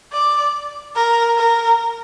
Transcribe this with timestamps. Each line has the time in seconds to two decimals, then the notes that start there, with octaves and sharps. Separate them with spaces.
0.12 D5
0.96 A#4
1.37 A#4